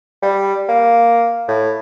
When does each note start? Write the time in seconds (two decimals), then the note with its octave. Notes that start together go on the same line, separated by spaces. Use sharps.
0.22 G3
0.69 A#3
1.48 A2